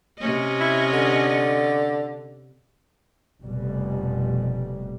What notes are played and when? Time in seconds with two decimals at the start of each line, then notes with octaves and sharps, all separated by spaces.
0.19 C3 C#4 D#5
0.61 E4
0.93 D3
3.43 F1 F2 B2 G3